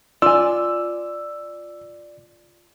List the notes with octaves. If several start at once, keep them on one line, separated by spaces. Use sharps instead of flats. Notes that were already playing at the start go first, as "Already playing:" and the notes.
F4 D5 G#5 E6